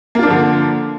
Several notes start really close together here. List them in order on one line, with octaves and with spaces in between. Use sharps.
A#3 F4 D4 F3 D3